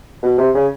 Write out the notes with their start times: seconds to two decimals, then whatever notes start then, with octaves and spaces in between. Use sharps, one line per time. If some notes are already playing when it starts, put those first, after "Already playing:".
0.23 B2
0.38 C3
0.55 C#3